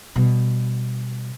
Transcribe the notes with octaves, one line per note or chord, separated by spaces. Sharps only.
B2 G3